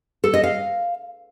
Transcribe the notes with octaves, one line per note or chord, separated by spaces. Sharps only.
A4
D#5
F5